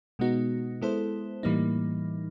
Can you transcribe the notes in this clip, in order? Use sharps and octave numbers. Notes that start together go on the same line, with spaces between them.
B2 G#3 B3 D#4 F#4
G#3 B3 E4 A4 C5
A2 E3 G3 A#3 D#4